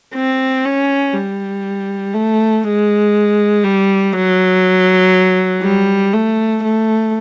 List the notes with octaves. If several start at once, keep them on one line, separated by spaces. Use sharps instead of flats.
C4
C#4
G3
A3
G#3
G3
F#3
G3
A3
A3